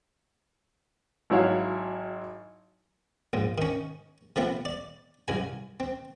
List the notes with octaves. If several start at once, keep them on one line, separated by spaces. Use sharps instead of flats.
G#1 F#3 E4 C#5 F5
A#1 G#2
D#3 C#4
F3 A3 B3 C4
D5
C2 F#2 G#5
C4